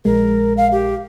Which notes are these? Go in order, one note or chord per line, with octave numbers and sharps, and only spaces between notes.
A#1 G#3 A#4
F5
G4